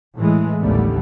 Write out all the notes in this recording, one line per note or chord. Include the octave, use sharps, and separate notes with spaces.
A2 E3 G#3
A1 D#2 D3 G3 A3 B3